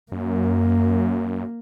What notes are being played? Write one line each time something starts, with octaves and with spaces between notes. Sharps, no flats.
F#2 A#3